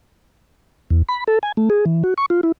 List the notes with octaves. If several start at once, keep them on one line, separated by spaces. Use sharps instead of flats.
E2
B5
A4
G#5
A3
G#4
E3
F#4
C#6
F4
E4